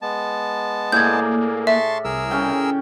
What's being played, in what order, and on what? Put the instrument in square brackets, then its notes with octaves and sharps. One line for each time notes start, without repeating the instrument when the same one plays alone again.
[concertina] G#3 B3 A5
[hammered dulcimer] A2 G#4 D5 [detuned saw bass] A#3 [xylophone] G6 G#6
[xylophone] E5 [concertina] A5 C6 C#6
[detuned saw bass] C2 [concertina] G#4 A#4 E6
[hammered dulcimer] C#3 C#4 G5